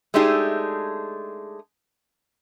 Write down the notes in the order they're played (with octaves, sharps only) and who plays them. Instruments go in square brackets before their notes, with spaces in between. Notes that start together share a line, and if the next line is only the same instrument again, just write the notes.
[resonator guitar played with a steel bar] G#3 A3 D4 D#4 G4 G#4